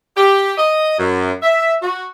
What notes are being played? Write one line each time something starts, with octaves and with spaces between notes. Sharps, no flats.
G4
D#5
F#2
E5
F#4